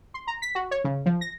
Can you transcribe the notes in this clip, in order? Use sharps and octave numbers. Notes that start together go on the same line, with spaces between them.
C6
A#5
B6
F#4
C#5
C#3
F3
A#6